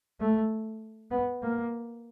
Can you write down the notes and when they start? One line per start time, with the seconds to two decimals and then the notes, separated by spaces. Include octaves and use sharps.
0.20 A3
1.11 B3
1.42 A#3